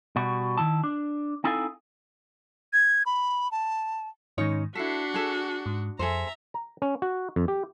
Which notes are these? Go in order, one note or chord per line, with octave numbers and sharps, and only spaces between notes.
B2 G3 F#4
D#3 F#3 E4 A5
D4
C4 D#4 E4 A4 F5 G#5
G#6
B5
A5
G#2 D#3 C#4 D#4 C#5
D4 E4 F#4 A4 B6 C7
G#4 A4
G#2
F2 G#4 A4 C5 E5 A#5
A#5
C#4
F#4
F2
G4